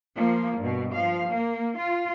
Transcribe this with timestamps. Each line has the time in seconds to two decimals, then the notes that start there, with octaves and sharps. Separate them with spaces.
0.16 F3 A#3
0.59 G2 B2
0.94 F3 F5
1.30 A#3
1.79 F4